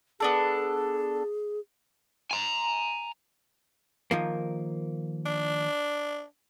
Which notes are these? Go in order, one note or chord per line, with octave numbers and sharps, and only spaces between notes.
B3 D4 G#4 A4
G#5 A#5
D#3 F3 A#3
D4